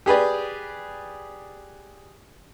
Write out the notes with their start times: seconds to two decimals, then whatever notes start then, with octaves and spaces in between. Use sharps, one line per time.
0.06 G4 G#4 B4 D5